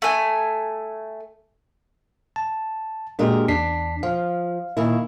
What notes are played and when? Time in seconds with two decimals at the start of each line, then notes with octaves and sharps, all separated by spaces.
0.02 A3 G#5
2.36 A5
3.19 A#2 G#3 D4 F#4 G4 A#4
3.48 E2 D4 B6 C7
4.03 F3 F5
4.77 A#2 D#3 E4